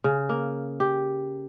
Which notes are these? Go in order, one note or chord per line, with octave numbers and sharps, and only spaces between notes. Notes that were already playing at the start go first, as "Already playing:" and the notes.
C#3
A#3
G4